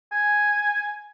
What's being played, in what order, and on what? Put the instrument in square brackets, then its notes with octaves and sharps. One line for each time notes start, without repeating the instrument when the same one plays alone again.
[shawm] G#5